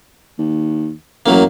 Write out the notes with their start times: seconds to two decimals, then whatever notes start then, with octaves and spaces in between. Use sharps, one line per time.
0.39 D#2
1.26 A1 F#2 F#3 A#3